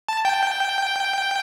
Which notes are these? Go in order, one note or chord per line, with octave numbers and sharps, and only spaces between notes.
A5
G5